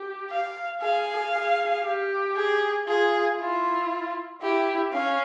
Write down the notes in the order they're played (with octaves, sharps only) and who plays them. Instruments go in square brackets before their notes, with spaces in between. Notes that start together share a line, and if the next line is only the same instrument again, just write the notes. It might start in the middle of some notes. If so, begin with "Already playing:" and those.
Already playing: [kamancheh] G4
[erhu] F5
[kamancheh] G#4 [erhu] F5
[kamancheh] G#4
G4
[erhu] G#4
[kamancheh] F4 [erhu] G#4
[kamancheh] E4 [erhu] F4
[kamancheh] E4 [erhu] G4
[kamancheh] C#4 [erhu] F5